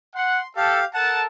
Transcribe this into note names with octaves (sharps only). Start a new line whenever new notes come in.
F#5 C6
G4 A4 F5
A4 A#4 F#5 A5